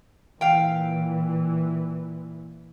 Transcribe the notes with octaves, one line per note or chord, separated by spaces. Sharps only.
A#2 E3 F5 G5